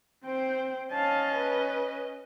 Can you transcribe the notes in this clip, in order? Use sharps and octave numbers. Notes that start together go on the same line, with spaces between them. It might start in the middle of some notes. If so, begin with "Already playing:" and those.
C4 C5 G5
C#4 D#5 F5 A5
B4